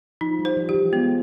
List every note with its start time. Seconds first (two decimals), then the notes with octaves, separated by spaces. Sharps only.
0.21 F3 D#4
0.39 G3
0.45 C5
0.57 F3
0.69 E3 G4
0.74 F3
0.92 G#3 B3